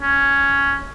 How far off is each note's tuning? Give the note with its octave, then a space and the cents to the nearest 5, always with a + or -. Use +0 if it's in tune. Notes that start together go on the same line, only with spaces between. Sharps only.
C#4 +5